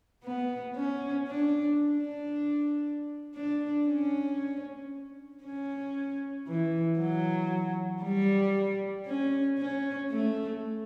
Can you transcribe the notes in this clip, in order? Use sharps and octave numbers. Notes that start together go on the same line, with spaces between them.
B3
C#4
D4
D4
D4
C#4
C#4
E3
F#3
G3
C#4
C#4
A3